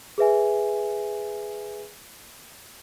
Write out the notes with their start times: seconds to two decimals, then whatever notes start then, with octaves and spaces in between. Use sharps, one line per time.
0.18 G#4 B4 E5 G#5